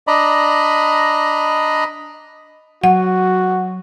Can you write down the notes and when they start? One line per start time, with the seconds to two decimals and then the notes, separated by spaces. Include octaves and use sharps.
0.07 D4 D5 D#5 A#5 B5
2.84 F#3 F#4 F#5